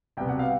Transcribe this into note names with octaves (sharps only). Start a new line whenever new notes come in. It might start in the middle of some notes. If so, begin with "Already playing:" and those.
C2 B2 G3 B3 G5
F#5
F5